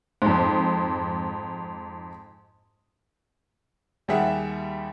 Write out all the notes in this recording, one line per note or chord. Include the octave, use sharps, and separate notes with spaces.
F2 G#2
D#2 G3 G4 G#4 E5 F#5